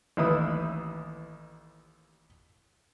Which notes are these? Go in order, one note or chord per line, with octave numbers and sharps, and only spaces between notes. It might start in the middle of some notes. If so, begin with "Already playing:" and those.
A1 D#2 E4 B4 D#6